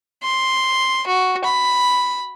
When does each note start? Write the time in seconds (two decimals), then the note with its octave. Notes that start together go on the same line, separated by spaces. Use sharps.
0.23 C6
1.07 F#4
1.44 B5